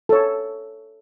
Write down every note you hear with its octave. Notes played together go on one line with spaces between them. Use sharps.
A4 C#5